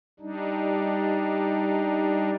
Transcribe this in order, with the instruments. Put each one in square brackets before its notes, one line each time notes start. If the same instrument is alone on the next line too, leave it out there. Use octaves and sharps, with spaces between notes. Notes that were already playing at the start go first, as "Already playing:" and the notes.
[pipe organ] G3 D4 D#4